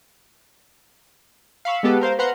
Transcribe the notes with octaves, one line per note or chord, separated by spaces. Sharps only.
F5 B5 C#6 E6
G#3 B3 G4 A4 B4
A#4 C5 F5
B4 C5 F5 F#5 A#5 C6